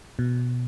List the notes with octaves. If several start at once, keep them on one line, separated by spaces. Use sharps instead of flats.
B2